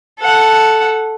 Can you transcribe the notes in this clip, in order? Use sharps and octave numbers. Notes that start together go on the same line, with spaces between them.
A4 F#5